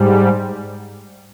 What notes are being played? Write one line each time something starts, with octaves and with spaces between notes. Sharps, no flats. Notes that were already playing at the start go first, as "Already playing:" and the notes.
Already playing: G#2 G3